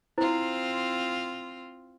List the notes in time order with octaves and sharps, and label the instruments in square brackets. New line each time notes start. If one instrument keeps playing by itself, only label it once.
[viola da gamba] C4 F4 [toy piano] E4 C5